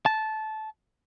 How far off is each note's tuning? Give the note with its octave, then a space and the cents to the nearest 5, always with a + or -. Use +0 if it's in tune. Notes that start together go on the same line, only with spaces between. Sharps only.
A5 -15